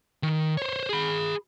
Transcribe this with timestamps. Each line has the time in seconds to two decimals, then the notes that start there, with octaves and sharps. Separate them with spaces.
0.23 D#3
0.57 C5 C#5
0.89 G#4 B5